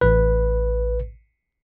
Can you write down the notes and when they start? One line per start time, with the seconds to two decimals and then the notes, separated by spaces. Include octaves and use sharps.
0.01 A1 B4